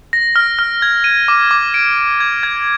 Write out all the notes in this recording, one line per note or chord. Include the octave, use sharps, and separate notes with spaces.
A#6
F6
F6
G#6
D#7
D6
D6
D7
D7
G#6
G#6